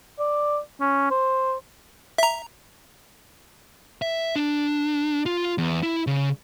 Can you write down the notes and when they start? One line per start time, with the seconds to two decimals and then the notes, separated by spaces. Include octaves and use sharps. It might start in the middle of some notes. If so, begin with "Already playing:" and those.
0.19 D5
0.80 C#4
1.11 C5
2.18 E5 A#5
4.02 E5
4.36 D4
5.26 F4
5.58 E2
5.83 E4
6.07 C#3